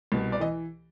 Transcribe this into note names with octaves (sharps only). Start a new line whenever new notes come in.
C2 B2
D5
E3 D#5